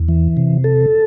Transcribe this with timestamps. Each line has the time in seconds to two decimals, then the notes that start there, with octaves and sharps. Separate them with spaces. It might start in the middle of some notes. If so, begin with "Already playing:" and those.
Already playing: E2
0.08 E3
0.37 C3
0.64 A4